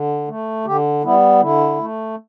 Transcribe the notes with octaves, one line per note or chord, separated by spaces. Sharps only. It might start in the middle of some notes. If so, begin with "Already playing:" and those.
Already playing: D3
A3
D3 G4
G3 B3 E4
D3 E4
A3